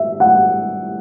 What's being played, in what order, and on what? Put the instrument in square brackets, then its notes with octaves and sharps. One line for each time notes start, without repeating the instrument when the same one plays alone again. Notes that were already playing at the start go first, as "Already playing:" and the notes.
Already playing: [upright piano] E5
F#5